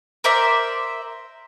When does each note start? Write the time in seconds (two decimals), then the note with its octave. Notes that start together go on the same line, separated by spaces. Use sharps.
0.24 A#4 C5 D5 E5